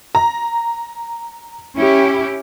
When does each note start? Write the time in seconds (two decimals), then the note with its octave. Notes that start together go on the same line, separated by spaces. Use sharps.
0.15 A#5
1.75 C#4 E4 G4